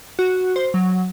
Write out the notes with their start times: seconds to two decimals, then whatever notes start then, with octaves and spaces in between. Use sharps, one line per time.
0.19 F#4
0.56 C5
0.74 F#3